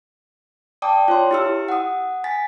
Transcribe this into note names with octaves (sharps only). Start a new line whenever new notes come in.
D5 G5 A5 D6 D#6
F4 C#5 C6
E4 G4 E6
F#5 D#6
G#5 A6 B6